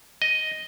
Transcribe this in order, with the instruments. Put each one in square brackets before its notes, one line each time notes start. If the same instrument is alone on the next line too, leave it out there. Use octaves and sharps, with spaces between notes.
[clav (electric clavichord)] D#5